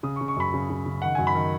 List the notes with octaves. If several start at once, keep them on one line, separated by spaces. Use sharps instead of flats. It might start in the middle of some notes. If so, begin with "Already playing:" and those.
C#3 D#6
C#6
C#3
C#6
F#2 B5
C#3
C#3
C#3
D#3 F#5
F#2 G#5
B5
D#3